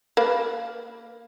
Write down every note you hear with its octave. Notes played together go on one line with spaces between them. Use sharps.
A#3 B4